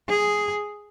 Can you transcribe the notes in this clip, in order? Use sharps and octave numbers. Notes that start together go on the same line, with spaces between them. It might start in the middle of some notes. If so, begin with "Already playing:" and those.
G#4